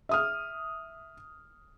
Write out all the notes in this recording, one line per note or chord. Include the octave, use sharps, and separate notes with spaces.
E5 D#6 F6